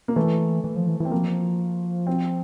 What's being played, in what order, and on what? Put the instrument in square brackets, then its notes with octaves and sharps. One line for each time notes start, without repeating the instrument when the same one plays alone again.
[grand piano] A#3
[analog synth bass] E3 [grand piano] A3
[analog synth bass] E3
F3
E3
[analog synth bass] E3 [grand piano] C4
[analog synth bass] F3 [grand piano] A#3
[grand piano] C4